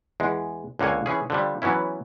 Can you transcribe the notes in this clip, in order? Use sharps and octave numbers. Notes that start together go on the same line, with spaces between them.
E2 G#3
C#2 D3 A#3 C#5 G#5
E3 C#4 G#4
D3 F3 G3
E3 F#3 B3 C#4 E4